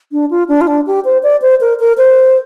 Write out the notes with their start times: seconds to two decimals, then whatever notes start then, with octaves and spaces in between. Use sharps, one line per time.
0.12 D4
0.31 F4
0.48 D4
0.61 F4
0.67 D4
0.87 G4
1.05 C5
1.23 D5
1.42 C5
1.61 A#4
1.80 A#4
1.98 C5